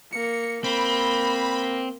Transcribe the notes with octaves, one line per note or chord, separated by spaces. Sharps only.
A#3 C#7
A#3 C4 B5